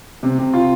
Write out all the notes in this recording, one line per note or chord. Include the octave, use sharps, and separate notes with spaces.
C3
C3
F4